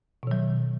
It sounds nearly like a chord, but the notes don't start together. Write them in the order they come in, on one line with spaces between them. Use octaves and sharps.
B2 D#3 F#3